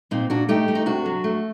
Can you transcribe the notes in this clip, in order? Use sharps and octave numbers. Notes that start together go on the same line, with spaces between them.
A#2 C4 D#4
A#2 D4 F#4
A3 D#4 G4
A3
D#4
C3 D4 F#4
F#3
A3